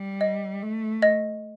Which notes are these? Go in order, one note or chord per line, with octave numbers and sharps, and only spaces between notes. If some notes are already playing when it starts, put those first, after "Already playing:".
Already playing: G3
D#5
A3
D#5